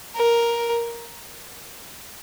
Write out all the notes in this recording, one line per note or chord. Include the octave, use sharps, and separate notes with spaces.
A#4